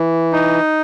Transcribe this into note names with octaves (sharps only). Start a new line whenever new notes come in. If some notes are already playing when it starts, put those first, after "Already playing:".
Already playing: E3
D#4